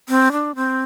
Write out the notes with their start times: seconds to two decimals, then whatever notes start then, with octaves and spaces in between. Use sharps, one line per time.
0.09 C4
0.32 D4
0.55 C4